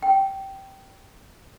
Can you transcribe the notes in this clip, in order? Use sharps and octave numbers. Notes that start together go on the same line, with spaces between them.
G5